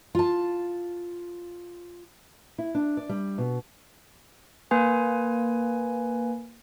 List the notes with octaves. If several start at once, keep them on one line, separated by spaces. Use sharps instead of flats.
F4 A5
E4
D4
D5
G3
B2
A#3 B4 G#5